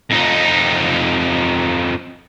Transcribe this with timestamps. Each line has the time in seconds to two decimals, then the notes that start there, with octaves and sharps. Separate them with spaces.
0.10 F2 D#4